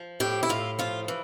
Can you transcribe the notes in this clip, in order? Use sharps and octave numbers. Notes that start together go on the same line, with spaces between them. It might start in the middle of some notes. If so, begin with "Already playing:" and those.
Already playing: F3
A2 G4
E4
A2 F4
F3 F4
E3